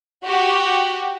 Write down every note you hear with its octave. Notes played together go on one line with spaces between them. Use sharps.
F#4 G4